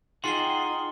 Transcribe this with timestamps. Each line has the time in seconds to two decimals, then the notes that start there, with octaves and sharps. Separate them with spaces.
0.24 D#4 F4 G#4 F#5 G5 C6 C7 G7